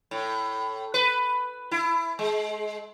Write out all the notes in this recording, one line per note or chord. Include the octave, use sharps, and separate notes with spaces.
A2
B4
E4
G#3